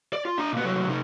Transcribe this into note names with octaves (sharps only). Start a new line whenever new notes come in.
D5
F4
D4 A#5
A#2 B3
C2 F#3
C3 D#4